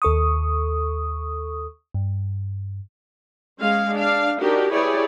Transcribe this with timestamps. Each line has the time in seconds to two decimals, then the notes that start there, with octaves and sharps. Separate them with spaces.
0.02 D#2 A4 C#6 D#6
1.94 G2
3.60 G#3 C#4 F5
3.94 D4 F5
4.41 D4 D#4 F#4 G4 A#4
4.71 E4 G4 G#4 B4 C#5 D5